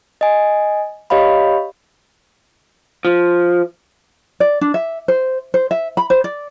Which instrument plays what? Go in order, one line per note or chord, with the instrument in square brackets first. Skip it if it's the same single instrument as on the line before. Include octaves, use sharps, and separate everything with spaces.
[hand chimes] D#5 G#5
G4 C#5 D#5 F5 B5
[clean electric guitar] F3
[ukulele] D5
D4
E5
C5
C5
E5
B5
C5
D5